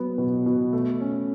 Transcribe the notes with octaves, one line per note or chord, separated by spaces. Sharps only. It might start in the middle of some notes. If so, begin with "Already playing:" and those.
Already playing: F#3 B3
B2
B2
A3
C#4